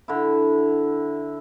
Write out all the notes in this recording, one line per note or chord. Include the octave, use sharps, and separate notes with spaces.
D3 E4